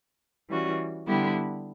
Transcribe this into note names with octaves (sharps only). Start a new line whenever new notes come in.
E3 G3 C#4 F#4
D3 G3 B3 E4 G4